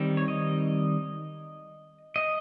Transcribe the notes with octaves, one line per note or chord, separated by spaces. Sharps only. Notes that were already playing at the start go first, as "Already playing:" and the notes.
Already playing: D#3 G3 C4
C#5
D#5
D#5